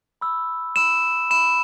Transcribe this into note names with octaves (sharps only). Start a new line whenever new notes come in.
B5 E6
B5 E6 E7
B5 E6 E7